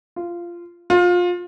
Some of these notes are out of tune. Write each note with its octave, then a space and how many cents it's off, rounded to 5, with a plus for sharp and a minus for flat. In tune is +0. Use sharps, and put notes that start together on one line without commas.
F4 -15
F4 +25